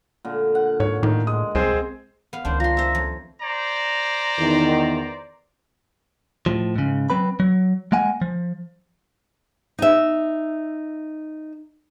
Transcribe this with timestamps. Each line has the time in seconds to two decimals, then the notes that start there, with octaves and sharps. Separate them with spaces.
0.25 A#2 D3
0.55 F#5
0.80 G#2 C#5
1.03 A2 D#3
1.27 G#3 D#6
1.55 C2 C4 G#4 C5
2.33 B3 F5
2.45 C#2 D#3 G#3 D4 C5
2.60 F3 A#5 C6
2.77 C5 E5
2.95 F2
3.41 C5 D5 A#5
4.39 E2 D#3
6.46 A2 F3
6.76 G#2 C#3
7.10 F#3 C4 B4 B5
7.40 F#3
7.92 G#3 A#3 F#5 G#5
8.21 F3
9.79 D#4 E5